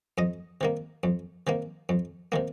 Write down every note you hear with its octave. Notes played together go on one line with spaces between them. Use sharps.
F2 D#5
C3 D#3 A#3
F2
C3 D#3 A#3
F2
C3 D#3 A#3